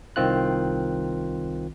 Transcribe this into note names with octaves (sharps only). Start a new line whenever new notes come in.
C2 D#3 C4 F4 F#6